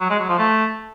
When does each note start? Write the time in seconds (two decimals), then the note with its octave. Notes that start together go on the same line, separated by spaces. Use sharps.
0.01 F#3
0.10 G#3
0.20 F#3
0.29 F3
0.38 A3